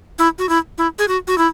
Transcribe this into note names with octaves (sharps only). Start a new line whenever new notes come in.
E4
F#4
E4
E4
G#4
F#4
F#4
E4